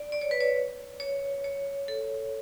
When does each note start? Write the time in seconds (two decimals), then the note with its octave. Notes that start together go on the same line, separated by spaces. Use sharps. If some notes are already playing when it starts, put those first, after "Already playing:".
Already playing: D5
0.12 D5
0.21 C#5
0.31 B4
0.40 C#5
1.00 C#5
1.44 C#5
1.88 A4